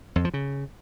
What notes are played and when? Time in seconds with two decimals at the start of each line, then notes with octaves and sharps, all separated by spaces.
0.16 F2
0.25 F3
0.34 C#3